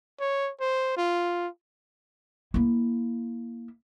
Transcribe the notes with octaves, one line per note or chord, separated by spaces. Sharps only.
C#5
C5
F4
A#3 E4